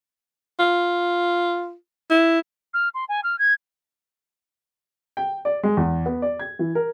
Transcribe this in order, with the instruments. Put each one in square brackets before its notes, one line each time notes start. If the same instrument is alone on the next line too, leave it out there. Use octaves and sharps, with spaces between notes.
[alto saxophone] F4
E4
[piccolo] F6
C6
G#5
F6
G#6
[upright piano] G5
D5
G#3
E2
B3
D5
G#6
E3
A#4